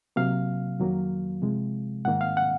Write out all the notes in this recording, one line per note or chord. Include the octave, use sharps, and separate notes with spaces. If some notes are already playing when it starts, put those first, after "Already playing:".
C3 F#3 A#3 F5
F2 D#3 F#3 A#3
C3 F3 G#3
G#2 D#3 A#3 F#5
F5
F#5